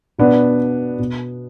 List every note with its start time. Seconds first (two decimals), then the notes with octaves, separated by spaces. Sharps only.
0.18 B2 B3 D4
0.99 B2